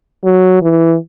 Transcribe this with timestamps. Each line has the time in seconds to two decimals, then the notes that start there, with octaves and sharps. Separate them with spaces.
0.24 F#3
0.62 E3